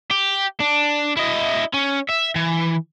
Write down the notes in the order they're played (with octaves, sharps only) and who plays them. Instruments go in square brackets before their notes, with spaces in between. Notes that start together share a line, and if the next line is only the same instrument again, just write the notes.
[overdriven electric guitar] G4
D4
E4 D#5
C#4
E5
E3